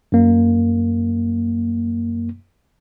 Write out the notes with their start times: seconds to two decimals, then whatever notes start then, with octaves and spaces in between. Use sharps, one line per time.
0.12 F#2 A#3